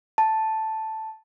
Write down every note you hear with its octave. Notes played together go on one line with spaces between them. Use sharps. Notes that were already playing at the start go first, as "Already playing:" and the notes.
A5